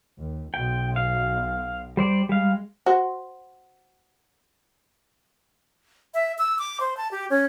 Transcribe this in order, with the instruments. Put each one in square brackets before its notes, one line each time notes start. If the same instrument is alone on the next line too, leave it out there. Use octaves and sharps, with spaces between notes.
[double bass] D#2
[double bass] B1 B2 [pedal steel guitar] G5
[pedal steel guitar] F5
G3 C5 D5
[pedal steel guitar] G3 F5 [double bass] G#3
[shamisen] F#4 C5
[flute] E5
E6
D6
C5
A5
G4
C#4